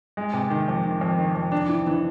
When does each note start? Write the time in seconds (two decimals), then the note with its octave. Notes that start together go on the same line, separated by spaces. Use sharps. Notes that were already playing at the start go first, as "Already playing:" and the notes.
0.17 G#3
0.34 C3
0.50 D#3
0.68 F2
0.85 D#3
1.01 F2
1.18 D#3
1.35 F2
1.52 D4
1.69 E3
1.87 E3